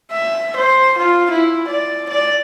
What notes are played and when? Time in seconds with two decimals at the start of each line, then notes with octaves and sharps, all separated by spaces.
0.12 E5
0.56 C5
0.98 F4
1.30 E4
1.67 D5
2.09 D5